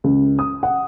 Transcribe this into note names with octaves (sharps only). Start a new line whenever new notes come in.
C#2
D#6
F#5